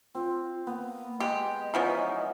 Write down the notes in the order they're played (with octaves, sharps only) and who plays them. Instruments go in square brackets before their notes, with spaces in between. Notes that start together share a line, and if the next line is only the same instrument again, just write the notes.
[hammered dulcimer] C4 [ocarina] F4
[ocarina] A#3 [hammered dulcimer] B3
[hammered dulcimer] G#3 [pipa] G4 [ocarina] D#5
[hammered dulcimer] B2 C#4 D#4 [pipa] E3 F3 B3